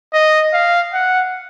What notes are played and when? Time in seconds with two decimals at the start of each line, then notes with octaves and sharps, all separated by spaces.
0.13 D#5
0.53 F5
0.93 F#5